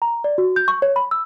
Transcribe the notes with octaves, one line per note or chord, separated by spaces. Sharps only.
A#5
D5
F#4
G6
C#6
C#5
B5
E6